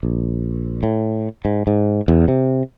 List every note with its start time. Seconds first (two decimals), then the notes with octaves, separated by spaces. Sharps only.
0.03 A#1
0.83 A2
1.45 G#2
1.67 G#2
2.08 E2
2.28 C3